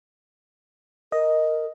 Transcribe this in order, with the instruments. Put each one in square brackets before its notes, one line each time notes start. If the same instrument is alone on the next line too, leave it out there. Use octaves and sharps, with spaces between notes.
[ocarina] A#4 [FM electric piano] D#5